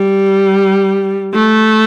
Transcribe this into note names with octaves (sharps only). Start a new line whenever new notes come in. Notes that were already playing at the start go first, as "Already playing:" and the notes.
Already playing: G3
A3